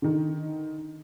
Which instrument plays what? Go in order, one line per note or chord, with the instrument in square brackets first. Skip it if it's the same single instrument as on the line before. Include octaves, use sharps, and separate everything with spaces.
[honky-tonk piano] D3 D#3